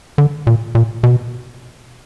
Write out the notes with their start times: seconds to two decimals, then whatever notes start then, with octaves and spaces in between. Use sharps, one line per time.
0.18 D3
0.47 A#2
0.75 A#2
1.03 B2